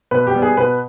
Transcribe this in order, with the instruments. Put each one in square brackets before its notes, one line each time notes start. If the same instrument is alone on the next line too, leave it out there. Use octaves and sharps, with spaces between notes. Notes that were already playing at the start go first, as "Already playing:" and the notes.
[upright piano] B2 B4
G4
G3 B3
G#4
B2 B4